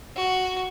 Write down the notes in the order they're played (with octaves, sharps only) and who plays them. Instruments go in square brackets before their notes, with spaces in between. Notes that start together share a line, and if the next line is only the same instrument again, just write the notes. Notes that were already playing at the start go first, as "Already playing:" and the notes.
[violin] F#4